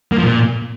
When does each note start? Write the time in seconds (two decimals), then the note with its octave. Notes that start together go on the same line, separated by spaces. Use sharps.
0.12 A#3
0.18 F3
0.23 A#2